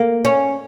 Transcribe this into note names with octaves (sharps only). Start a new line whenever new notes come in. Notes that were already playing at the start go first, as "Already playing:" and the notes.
Already playing: A#3
C#4